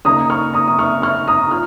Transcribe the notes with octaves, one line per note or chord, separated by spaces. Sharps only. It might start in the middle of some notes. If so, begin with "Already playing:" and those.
C#3 A#3 D#4 A#5 D#6
C#6 F6
A#5 D#6
D#6
C#6 F6
C#6 F6
A#5 D#6
F4 F6